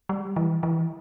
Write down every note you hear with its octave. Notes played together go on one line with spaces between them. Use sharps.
G3
E3
E3